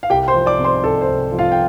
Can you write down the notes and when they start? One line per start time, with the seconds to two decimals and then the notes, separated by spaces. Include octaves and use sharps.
0.03 F5
0.10 C2 G4 G5
0.28 C5 C6
0.34 F3
0.46 D5 D6
0.58 C3
0.64 C5 C6
0.84 C2 A4
1.01 C5
1.08 C2
1.32 F3
1.39 F4 F5
1.52 G5